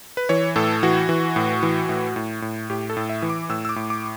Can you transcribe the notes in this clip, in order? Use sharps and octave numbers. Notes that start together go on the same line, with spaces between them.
B4
E3 C#5
A2 A4
E3 F#4
E3
A2
E3
A2
A2
A2
A2 G4
A4
A2
E5
E3
D6
A2 E6
E6
D6
A2
D6